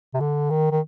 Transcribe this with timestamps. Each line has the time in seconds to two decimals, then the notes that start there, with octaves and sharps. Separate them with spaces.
0.14 C3
0.20 D3
0.51 D#3
0.72 D#3